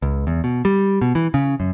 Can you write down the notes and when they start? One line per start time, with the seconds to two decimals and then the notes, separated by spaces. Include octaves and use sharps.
0.02 C#2
0.27 E2
0.44 B2
0.65 G3
1.01 B2
1.15 E3
1.34 C#3
1.60 F#2